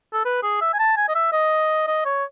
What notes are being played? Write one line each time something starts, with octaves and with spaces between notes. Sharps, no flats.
A4
B4
G#4
E5
G#5
A5
G#5
D#5
E5
D#5
D#5
C#5